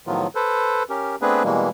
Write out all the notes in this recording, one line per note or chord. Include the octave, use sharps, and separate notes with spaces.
A2 D#3 F3 F#3 B3 F4
A4 B4 C5
C#4 G4 A#4
A3 B3 C4 D4 G#4 B4
B2 E3 G3 G#3 A#3